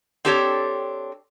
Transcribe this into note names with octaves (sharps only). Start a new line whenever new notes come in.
C4 D4 G4 A4 C5 C#5